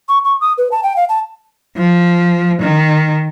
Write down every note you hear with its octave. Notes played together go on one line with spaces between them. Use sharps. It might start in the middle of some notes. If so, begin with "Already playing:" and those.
C#6
C#6
D#6
B4
A5
G5
F5
A5
F3
D#3